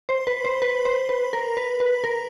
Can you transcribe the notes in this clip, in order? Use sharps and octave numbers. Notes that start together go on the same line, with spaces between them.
C5
B4
C5
B4
C5
B4
A#4
B4
B4
A#4